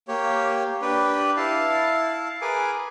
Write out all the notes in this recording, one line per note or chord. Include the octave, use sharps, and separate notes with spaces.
A#3 G4 C#5
D4 G4 B4
E4 F5 A5
G#4 A#4 B4 G#5 D6